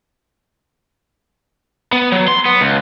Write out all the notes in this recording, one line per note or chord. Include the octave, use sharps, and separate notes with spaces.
B3
F#3
C6
B3
C#2